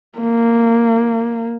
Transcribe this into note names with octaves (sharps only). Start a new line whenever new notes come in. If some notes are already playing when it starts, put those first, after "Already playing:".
A#3